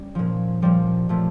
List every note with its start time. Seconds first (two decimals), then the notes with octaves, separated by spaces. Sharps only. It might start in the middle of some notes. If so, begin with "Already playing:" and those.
Already playing: G3 C#4
0.15 A#2 F3
0.62 A#2 F3 G3
1.09 A#2 F3 A3